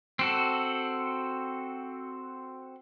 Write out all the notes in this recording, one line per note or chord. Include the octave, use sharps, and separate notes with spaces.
C4 F#4 A4